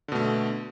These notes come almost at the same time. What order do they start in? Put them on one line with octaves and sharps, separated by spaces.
D3 B2 A3